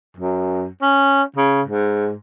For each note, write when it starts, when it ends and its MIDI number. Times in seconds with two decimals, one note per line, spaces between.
0.17 0.66 42
0.82 1.23 61
1.36 1.62 49
1.67 2.13 44